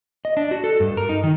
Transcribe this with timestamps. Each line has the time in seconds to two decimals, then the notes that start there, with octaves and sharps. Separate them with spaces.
0.25 D#5
0.37 D4
0.51 F#4
0.64 A4
0.80 G2
0.97 A#4
1.09 D#4
1.24 D#3